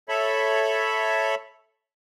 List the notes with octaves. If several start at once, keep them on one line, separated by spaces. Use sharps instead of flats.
A4 C#5 E5 B5